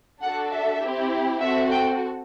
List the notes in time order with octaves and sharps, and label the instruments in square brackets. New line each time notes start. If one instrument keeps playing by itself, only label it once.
[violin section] D4 F#4 A4 F#5
E5
C4 E4 G4
C4 F#4 A4 E5
G5